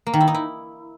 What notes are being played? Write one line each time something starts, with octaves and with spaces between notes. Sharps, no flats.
A#3
D#3
E4
D#4
E4